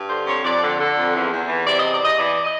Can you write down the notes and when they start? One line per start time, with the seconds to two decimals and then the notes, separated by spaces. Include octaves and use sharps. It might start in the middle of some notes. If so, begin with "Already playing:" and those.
Already playing: G2
0.09 D3 C5
0.27 F2 C#5
0.44 F2 D5
0.62 D3
0.79 D3
0.97 F2
1.15 E2
1.32 E2
1.49 E3
1.65 C3 D5
1.79 E2 D#5
1.92 D5
2.01 E2 D#5
2.18 E3 D5
2.44 D#5